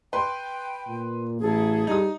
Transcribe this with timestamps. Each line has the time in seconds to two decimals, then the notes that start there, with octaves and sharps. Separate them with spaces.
0.13 B4 G5 C6
0.87 A#2
1.41 A1 E4 G#4 A4
1.87 G3 D#4 D#6